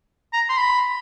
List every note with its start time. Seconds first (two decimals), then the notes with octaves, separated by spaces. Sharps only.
0.33 A#5
0.49 C6
0.58 B5